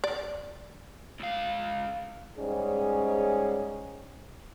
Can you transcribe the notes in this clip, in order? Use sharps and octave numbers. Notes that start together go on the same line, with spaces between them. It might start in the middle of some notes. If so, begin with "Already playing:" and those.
D5
C#2 F5
G#2 G3 C#4 G#4